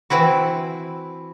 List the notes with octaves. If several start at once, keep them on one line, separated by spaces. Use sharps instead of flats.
E3 C4 E4 F#4